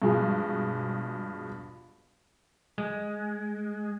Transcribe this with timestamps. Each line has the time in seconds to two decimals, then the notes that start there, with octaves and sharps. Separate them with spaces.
0.02 G2 B2 F3 G#3
2.78 G#3